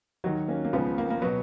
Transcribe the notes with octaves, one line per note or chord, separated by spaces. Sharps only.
D#2 D#3 F#3 D#4 F#4
A#3 C#4
A#3
C#2 C#3 F3 B3
A#3
A#3
B2 F#3 B3